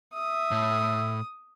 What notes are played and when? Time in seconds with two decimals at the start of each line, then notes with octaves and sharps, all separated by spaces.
0.14 E5 D#6
0.51 A2